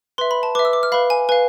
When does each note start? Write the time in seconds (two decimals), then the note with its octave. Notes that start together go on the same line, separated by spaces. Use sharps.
0.18 B4 E5 C6
0.31 B5
0.43 A5
0.55 B4 E5 D6
0.65 E6
0.73 D6
0.83 F6
0.92 B4 F5 B5
1.10 G#5
1.29 B4 G#5
1.32 F5